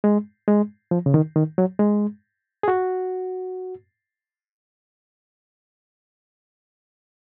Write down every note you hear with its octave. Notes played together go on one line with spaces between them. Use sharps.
G#3
G#3
F3
C#3
D#3
D#3
F#3
G#3
G#4
F#4